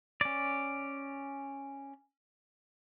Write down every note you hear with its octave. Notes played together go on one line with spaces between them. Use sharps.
C#4 D5